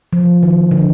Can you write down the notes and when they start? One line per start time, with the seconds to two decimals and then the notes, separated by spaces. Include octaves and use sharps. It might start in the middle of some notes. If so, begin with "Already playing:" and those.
0.13 F3
0.43 D#3
0.71 D3